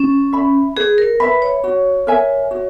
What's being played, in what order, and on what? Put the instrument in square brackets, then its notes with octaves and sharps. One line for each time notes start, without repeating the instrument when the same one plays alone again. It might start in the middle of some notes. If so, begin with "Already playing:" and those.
Already playing: [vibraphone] C#4
[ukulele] E5 B5
[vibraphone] G#4 [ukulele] B4
[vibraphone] A#4
[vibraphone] B4 [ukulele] E5 B5
[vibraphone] C#5
[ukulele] F#4
A#4 E5 G#5
F#4